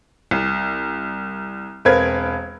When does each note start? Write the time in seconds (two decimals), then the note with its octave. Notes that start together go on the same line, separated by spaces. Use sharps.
0.31 C2
1.85 E1 C4 A#4 B4 F5 G#6